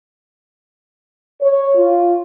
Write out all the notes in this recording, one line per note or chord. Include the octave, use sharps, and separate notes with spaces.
C#5
F4